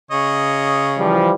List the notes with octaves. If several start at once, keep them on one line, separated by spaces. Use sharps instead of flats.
C#3 C#5 D#5
E3 F3 G3